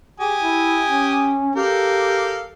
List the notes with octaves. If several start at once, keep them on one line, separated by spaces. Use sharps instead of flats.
G4 G#4 G#5 D#6
E4
C#4
G4 A4 A#4 F5